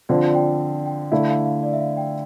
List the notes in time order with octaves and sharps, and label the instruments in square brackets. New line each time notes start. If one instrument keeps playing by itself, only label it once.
[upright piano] D3 F3 C4 F4 [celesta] D5
[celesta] G5
G5
[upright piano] D3 A3 E4 [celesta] F5
[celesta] F5
F5
D5
E5
F5
G5